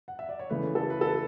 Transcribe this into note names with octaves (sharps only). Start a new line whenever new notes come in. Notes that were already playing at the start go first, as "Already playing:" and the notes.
F#5
E5
D5
C#5
C#3 E3 A3 B4
A4
B4
A4